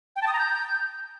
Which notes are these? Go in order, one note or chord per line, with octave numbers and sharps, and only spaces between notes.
G5
A5
D#6
A#5
G6